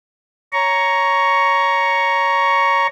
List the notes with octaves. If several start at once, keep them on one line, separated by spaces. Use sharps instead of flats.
C#5 A#5 C#6